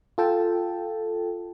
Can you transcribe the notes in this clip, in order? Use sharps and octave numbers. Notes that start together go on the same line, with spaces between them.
F4 A4 G5 A5